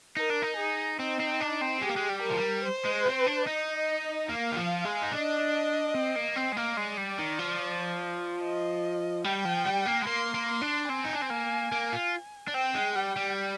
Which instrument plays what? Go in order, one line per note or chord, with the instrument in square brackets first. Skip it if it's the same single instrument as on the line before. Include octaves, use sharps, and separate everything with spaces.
[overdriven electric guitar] D#4 [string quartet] A#4
[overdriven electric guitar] D4
D#4
[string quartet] G#4
[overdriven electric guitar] C4 [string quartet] D#4
[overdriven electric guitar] C4
D4
C4
[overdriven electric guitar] G#3 [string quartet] G4
[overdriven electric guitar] A#3
G#3
G3
[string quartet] A#4
[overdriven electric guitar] F3
G3
[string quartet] C5
[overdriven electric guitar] G#3
C4
D4
[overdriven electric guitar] D#4 [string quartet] D#5
[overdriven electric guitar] A#3 [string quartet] F5
[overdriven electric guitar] D#3
F3
G#3
D#4
[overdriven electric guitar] D4 [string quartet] D#5
[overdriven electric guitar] C4
A#3
C4
G#3
A#3
[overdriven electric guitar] G#3 [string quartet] D5
[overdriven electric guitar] G3
D#3
F3
[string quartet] D#5
[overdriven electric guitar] G3 [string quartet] G5
[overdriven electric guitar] F3
G3
A#3
G#3
[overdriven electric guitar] A#3 [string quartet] C6
[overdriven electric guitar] A#3
[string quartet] C6
[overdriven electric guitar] D4
[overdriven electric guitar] C4 [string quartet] G#5
[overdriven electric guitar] D#4
D4
C4
A#3
A#3
F4
D4
[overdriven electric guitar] C4 [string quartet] G5
[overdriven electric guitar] G#3
[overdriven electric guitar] G3 [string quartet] G5
[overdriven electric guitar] G3